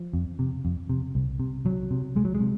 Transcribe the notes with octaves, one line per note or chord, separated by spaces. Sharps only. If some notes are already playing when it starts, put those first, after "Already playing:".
Already playing: F3
F2
C3
F2
C3
C2
C3
C2 F#3
C3
C2 G#3
F#3
G#3
C3